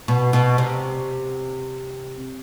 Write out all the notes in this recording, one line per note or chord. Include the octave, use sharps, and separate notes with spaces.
B2
B2
C3